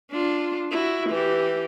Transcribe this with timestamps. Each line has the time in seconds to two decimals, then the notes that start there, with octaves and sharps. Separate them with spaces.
0.11 D4 F4
0.71 E4 F#4
1.09 E3 G4